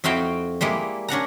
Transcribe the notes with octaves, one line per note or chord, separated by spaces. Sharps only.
F2 E4 F#4 F5 G5
G3 G#3 A#3 E4
C#4 D4 F#5 A#5